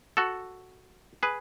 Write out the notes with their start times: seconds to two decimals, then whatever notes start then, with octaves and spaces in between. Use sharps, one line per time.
0.17 F#4 A4
1.23 G#4 B4